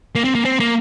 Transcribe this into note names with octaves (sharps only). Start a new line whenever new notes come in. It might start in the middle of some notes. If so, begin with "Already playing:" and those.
A#3
C4
A#3
C4
A#3